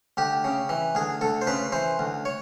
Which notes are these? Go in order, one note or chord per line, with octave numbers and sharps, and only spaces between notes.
D2 G4
C#3
E3
D2 G#4
D2 A4
C5
C#3 B4
E3 C5
D2
C#5